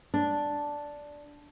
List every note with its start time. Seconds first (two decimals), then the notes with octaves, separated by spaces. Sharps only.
0.14 D4